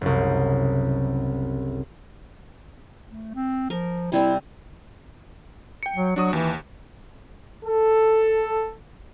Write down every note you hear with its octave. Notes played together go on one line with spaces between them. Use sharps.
F#1 C2
A3
C4
F3 A#4
C3 G3 C4 E4
G5 C#7
F#3
F#3 D4 F#4 D#6
D#2 E3
A4